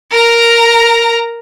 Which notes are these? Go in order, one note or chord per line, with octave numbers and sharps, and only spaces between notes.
A#4 A#5